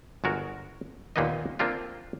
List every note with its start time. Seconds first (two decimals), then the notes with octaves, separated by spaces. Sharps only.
0.24 G1 G#3 F#4 A#4
1.16 D#2 A#2 A#3 B3 D#4 D#5
1.59 A#3 C4 D4 F4 G4